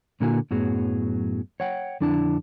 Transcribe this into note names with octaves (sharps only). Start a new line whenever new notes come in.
A#2 D3 A#3 E4 F#4 G#5
F#2 A2 F#3 B3 G#4
C#5 F#5 G5
F2 D3 D4 E4 A5